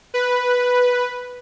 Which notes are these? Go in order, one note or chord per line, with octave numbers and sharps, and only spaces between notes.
B4